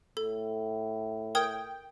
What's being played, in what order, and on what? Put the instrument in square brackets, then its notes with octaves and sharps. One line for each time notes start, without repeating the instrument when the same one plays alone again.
[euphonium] A2 [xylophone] A4
[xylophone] A#4 D#6 G#6 [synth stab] G5